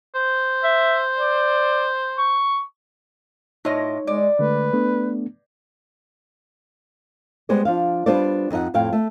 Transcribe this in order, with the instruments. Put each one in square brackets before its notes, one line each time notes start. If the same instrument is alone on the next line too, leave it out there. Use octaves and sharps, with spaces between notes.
[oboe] C5
[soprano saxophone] E5
D5
C#6
[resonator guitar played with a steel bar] A2 F4 D#5 [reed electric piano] D#4 C#5
[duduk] G#3 [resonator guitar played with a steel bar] D5
[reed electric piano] D3 G#3 A3 [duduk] B4
[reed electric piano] A3 B3 D4
[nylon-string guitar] G3 G#3 B3 C5 D5
F3 D4 F5
G3 B3 D4 F4 C5 D5
F2 D#4 F#5
F2 A2 F5 G5
A3